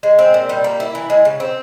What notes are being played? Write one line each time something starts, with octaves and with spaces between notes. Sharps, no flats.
G#3
C4
A#2
G3
A#3
E4
E3
G#3
C#3
C4